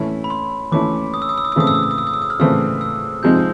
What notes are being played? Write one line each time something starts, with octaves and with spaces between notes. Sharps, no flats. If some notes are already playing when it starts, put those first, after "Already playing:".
Already playing: E3 A3 C#4 E4
B5
C6
E3 A3 C#4 E4 D6
D#6
E6
D#6
E6
D#6
E6
C#3 E3 A3 C4 D#6
E6
D#6
E6
D#6
E6
D#6
E6
D#6
F6
C#3 E3 A3 C4 E6
E6
C3 F3 G#3 C4 D#4 G6